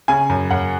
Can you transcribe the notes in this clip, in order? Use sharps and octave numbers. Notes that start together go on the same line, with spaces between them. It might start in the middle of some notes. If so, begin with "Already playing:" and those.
C#3 G#5
F#2
F#2 F#5